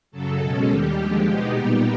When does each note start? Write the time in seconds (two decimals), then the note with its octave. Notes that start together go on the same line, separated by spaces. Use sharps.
0.11 F#2 C#3 F#3 A4
0.40 B2 G#3 C#4
0.68 D#2 D#3 G3 G4
0.96 D#2 D3 F3 G#3
1.24 B2 G#3 B3 D#4 G4
1.53 A#2 G3 B3 D#4